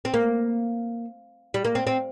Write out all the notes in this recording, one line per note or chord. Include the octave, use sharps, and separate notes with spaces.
C4
A#3
G3
A#3
C4
C4